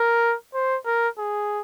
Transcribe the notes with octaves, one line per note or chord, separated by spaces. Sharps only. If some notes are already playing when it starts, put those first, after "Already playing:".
Already playing: A#4
C5
A#4
G#4